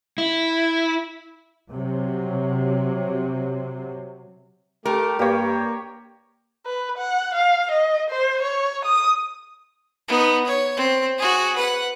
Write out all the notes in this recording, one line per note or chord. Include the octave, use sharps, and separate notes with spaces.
E4
C3 F#3
A3 G4 A#4
G2 A#3 G4 C#5
B4
F#5
F5
D#5
C5
C#5
D#6
B3 D#4
C#5
C4
F#4 G#4
B4 F#5